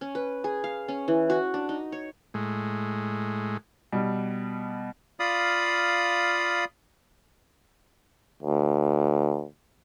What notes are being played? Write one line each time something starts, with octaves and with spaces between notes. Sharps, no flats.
C#4
B4
G#4
F5
C#4
E3
F#4
D4
D#4
C#5
A2 G#3
B2 G3
F4 D5 F5 B5 D#6
D2